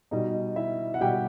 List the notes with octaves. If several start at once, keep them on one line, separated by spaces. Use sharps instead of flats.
B2 G3 D#4 D#5
E4 E5
F#5
B2 G3 G4 G5